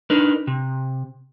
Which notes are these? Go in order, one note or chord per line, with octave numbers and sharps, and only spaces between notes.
D4 D#4 A#4 B4
C3